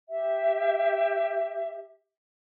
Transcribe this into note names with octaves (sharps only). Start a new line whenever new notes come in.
G4 E5